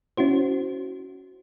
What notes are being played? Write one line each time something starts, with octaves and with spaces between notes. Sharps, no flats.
C#4 E4 F#4 C5